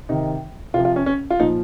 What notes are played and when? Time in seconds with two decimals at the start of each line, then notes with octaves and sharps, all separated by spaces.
0.09 C3 D#3 D#4
0.74 C3 F4
0.79 F3
0.85 F4
0.96 C#4
1.06 C#4
1.30 F4
1.40 A#2 F3 D#4